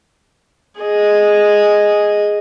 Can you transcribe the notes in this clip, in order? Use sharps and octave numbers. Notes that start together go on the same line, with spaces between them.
G#4 D#5